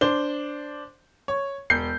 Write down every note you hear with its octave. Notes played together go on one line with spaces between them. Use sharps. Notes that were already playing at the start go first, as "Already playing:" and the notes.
D4 C5 G7
C#5
E1 G6 C7